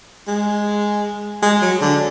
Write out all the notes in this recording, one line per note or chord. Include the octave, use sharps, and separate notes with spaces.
G#3
G#3
F#3
D3